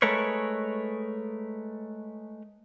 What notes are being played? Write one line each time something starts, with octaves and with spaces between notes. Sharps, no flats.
G#3 A3 A#4 B4 C#5